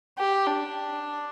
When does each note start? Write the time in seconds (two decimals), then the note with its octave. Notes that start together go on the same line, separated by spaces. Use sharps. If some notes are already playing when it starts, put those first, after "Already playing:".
0.18 G4
0.47 D4